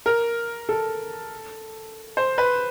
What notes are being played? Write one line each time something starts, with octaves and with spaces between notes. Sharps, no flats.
A#4
A4
C5
B4